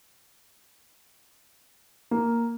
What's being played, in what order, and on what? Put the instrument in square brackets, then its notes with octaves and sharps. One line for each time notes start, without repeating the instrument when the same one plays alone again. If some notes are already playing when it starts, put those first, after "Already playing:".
[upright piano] A#3